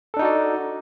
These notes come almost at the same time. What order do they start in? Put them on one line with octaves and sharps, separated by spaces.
A4 D4 D#4 F#4 D5